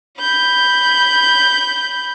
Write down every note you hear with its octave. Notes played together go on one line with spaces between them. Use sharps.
B5 G6